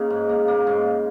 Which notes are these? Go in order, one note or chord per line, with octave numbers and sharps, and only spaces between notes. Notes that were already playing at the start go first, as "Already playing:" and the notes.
Already playing: C#3 A#3 C#4 D#4 A#4
G#2
A#3
A#3
G#2